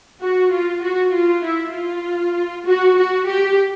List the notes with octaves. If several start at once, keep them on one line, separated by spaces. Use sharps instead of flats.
F#4
F4
F#4
F4
E4
F4
F#4
F#4
G4